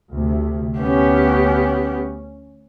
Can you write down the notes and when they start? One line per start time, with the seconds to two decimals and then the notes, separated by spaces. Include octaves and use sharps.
0.12 D2 C3
0.79 D2 B3 C#4 G4